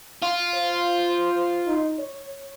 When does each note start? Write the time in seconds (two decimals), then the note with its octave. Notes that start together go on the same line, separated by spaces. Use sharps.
0.23 F4
0.55 C5
1.67 D#4
1.99 C#5